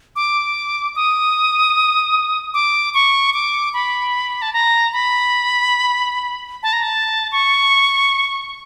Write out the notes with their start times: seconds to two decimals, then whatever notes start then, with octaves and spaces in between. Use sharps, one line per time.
0.16 D6
0.96 D#6
2.54 D6
2.94 C#6
3.34 D6
3.74 B5
4.42 A5
4.53 A#5
4.93 B5
6.63 A5
6.73 A#5
6.83 A5
7.32 C#6